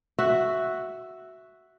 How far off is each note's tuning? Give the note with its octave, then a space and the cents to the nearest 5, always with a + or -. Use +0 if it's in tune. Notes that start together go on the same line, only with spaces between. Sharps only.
F#4 +0 E5 +0